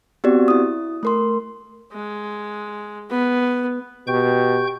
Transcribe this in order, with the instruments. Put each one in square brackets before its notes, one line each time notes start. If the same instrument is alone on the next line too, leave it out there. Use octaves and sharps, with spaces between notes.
[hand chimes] B3 C4 F#4 G4 D5
E4 D#6
A3 A#4 C6
[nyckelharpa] G#3
B3
[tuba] B2 [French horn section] G4 [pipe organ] G5 C#6 G6